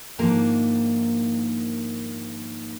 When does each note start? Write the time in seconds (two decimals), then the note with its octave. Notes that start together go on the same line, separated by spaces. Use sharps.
0.19 G#2 D#3 F3 A#3 D4 A#5